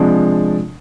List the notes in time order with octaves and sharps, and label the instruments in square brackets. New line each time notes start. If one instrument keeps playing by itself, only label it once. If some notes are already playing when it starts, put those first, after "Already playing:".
Already playing: [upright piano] C3 F3 G#3 D4